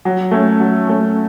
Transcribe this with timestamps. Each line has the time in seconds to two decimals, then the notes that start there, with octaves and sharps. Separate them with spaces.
0.05 F#3
0.31 A3 C#4
0.60 F#3
0.87 A3 C#4